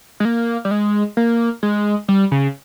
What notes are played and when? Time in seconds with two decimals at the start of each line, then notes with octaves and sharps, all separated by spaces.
0.20 G#3
0.25 A#3
0.65 G3
0.71 G#3
1.17 A#3
1.63 G#3
2.08 G3
2.31 C#3